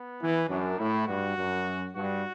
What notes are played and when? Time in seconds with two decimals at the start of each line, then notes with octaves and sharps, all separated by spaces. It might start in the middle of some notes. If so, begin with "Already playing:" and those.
Already playing: B3
0.20 E3
0.49 F#2 D4
0.78 A2 E4
1.07 G2 F#4
1.37 F#2
1.96 G2 F#4